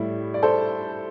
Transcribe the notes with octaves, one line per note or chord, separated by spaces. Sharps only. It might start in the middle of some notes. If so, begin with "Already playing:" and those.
Already playing: A2 G3 E4
D5
A4 C5